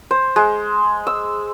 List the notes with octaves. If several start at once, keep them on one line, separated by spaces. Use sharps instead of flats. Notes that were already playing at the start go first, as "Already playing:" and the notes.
C5
G#3
E6